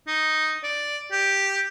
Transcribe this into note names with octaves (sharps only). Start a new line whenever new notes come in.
D#4
D5
G4